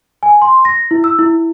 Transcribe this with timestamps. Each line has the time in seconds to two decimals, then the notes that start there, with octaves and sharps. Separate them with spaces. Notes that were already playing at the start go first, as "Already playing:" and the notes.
0.23 G#5
0.42 C6
0.65 A#6
0.91 E4
1.04 E6
1.19 E4